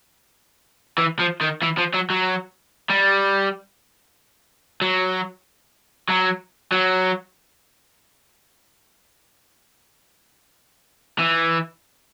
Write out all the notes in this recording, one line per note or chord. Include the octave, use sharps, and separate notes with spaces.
E3
F3
D#3
E3
F3
F#3
F#3
G3
F#3
F#3
F#3
E3